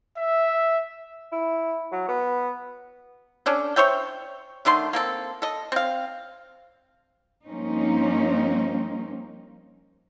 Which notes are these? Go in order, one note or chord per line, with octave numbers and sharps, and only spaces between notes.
E5
E4
F#3
B3
C#4 D4 A4
C5 C#5 E5 G5
D3 D#3 A3 C6
A#3 C4 A4
A4 D#5
C4 F5
G2 F3 A#3 C4 C#4 D#4